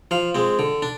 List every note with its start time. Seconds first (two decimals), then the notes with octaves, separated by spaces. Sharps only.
0.11 F3 F5
0.35 G#3 C4
0.59 D3
0.82 D4